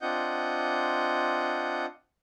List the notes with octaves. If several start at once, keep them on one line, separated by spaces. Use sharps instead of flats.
C4 D4 F4 D#5 F#5 G6